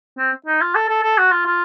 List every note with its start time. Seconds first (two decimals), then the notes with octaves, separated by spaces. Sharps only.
0.18 C4
0.47 D#4
0.61 F4
0.75 A4
0.89 A4
1.03 A4
1.18 F#4
1.32 F4
1.46 F4